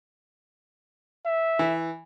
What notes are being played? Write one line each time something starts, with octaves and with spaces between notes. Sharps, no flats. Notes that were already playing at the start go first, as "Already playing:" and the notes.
E5
E3